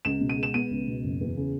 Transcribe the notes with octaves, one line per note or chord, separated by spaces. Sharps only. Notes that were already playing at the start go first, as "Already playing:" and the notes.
C#2 E7
B2
D#7
G#3
E7
B3 D#7
C#2
B2
F#1
E2
C#3